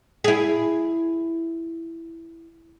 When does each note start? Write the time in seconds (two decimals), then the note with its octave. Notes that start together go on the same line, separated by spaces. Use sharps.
0.24 E4 G#4